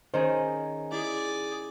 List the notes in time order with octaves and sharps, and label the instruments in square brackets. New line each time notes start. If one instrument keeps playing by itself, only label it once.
[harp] D#3 C#4 G#4 [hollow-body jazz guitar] C5
[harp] E4 [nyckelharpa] G#4 D5